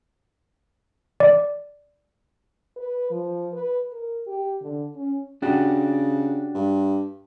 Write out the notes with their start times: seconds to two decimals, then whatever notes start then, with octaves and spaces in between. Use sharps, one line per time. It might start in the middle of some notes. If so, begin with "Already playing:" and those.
1.20 D5
2.77 B4
3.11 F3
3.53 B4
3.92 A#4
4.27 G4
4.61 D3
4.96 C#4
5.42 C#3 D4 F#4 G4
6.54 G2